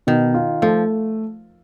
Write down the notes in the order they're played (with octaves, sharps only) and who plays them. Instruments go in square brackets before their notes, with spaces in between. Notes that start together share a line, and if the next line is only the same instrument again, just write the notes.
[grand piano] B2 [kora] D#3
[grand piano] F4
[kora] F3 [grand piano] A3